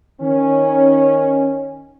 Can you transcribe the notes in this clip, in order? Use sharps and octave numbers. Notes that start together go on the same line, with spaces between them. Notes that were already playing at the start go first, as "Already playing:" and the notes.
D#3 C#4